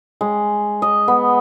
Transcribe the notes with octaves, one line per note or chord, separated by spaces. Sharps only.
G#3
D#5
B3